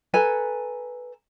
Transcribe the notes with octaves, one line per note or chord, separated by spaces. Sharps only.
A4 B4 G#5 A#5